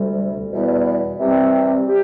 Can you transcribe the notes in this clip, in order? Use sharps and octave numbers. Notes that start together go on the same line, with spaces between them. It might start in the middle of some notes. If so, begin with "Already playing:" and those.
Already playing: D2 C3 G3
E2 B2 G3 B3 E4
C3 E3 G3 C4
G4